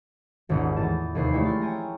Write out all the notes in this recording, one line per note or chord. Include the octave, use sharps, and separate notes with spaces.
D#1 G#1 G#2 D#4 B6
E2 A2 A5 E7
F1 D#2 A#4 B4 C7
G#3 A3 E4 C#5 D5 G5
E4 C6 C#6 F6 A6
C#5 G5 G#5 A#5